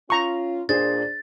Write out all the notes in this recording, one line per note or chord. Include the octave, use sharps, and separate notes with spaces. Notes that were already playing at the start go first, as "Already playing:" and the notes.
C#4 F4 A#5 C#6
A#2 D4 G#4 C5 A6